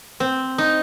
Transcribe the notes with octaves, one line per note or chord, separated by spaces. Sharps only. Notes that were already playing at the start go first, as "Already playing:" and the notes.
C4
D#4